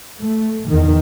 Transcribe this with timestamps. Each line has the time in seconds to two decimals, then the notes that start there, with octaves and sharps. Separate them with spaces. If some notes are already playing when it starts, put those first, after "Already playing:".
0.21 A3
0.68 E2 D#3